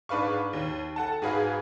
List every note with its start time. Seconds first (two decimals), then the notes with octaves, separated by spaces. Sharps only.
0.09 G#2 D4 B4 F5 C#6
0.53 D#2
0.96 A4 F#5 A5
1.22 G#2 F#4 G#4 B4 F5